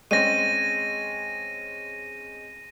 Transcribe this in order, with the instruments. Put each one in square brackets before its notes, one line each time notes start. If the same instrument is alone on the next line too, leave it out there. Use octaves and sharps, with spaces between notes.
[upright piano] G#3 C4 C#4 [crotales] A#6 D#7